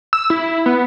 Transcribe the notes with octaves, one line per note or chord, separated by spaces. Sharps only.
E6
E4
B3